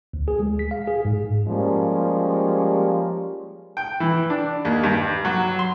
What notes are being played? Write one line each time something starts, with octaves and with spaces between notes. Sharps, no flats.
D2
G#4
G#3
B6
F5
G#4
G#2
F3 G3 G#3 A#3 C#4
G5
E3
D4
D#2
G2
F#3
C6